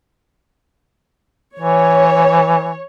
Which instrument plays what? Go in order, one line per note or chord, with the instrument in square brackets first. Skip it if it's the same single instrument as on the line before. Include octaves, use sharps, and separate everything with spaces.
[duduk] E3 [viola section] C#5